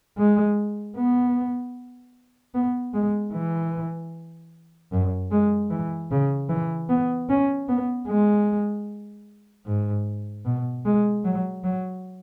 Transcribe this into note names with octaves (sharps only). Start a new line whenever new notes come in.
G#3
B3
B3
G#3
E3
F#2
G#3
E3
C#3
E3
B3
C#4
B3
G#3
G#2
B2
G#3
F#3
F#3